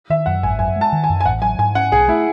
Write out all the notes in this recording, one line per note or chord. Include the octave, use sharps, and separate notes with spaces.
D#3 E5
F#2 F#5
G#1 G#5
F#2 G#5
G#3
A5
D#3
G#5
F#2
G#5
A1 F#5
F#3 G#5
G#2 G#5
C#4 F#5
B1 G#4
A3 E4